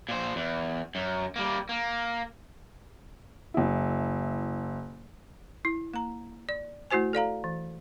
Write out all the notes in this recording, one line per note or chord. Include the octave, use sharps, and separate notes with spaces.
A#2 C5
E2
F#2
G3 A#3
A#3
F#1 E4
E4
A#3 A#5
D5
A3 E4 F#4 C5 G#5
A4 D5 F5 A#5
E3